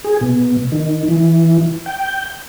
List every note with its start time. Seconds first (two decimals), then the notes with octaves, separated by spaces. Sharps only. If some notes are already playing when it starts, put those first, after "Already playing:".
0.04 G#4
0.21 B2
0.72 D#3
1.08 E3
1.86 G5